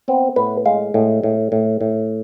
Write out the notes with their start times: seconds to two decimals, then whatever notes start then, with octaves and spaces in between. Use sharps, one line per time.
0.08 B3 C4
0.36 A2 B4
0.65 G#3 F5
0.94 A2
1.23 A2
1.52 A2
1.81 A2